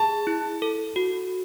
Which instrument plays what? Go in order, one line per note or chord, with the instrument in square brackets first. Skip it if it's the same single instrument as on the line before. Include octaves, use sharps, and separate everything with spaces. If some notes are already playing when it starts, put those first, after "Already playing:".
Already playing: [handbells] G#4 [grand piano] A5
[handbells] E4
A4
F#4